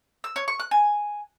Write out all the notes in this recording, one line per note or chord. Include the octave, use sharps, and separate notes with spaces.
E6
C#5
C#6
F#6
G#5